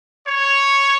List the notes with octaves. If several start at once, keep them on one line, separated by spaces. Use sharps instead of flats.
C#5